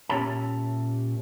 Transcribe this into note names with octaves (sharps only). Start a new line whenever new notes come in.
A#2 C#4 G4 C#5 E5 A5